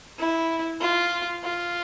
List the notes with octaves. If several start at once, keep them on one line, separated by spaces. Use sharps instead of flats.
E4
F4
F4